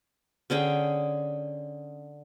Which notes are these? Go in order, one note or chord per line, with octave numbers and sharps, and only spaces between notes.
D3 C#4 G#4 G5